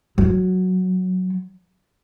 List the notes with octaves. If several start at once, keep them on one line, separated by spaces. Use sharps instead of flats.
F#3